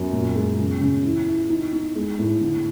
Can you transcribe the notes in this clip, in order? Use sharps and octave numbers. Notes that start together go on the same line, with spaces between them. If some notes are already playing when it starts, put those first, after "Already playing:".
Already playing: F#2
A#2
G#3
C#3
C#3
E3
E3
D#4
D#4
G#3
A2
D3